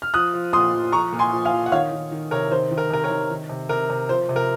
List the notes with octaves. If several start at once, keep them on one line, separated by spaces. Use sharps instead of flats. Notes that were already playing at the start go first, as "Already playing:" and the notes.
F6
F3 D#6 F#6
F3
A#2 C6 D#6
F3
F3 A#5 C#6
A#2
G#5 C6
F3
F5 G#5
F3
F#5
D#3 C#5 F5
D#3
D#3
C3 A#4 C#5
D#3 C5
D#3
A#4
C3 A#4
A#4 C#5
D#3
D#3
C3
C3 A#4
C3
F3 C5
C3
A#4